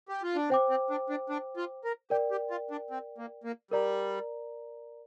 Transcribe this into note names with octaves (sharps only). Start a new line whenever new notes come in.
G4
F4
D4
C4 C5 G5 D6
C4
D4
D4
D4
F4
A#4
G4 A#4 D5 G5
G4
F4
D4
C4
A#3
A#3
G3 A#4 D5 A#5